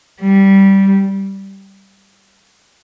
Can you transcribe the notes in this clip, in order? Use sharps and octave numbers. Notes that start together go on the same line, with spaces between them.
G3